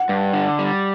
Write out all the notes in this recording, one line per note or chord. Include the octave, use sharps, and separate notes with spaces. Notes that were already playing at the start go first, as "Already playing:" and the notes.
Already playing: F#5
G2
D3
G3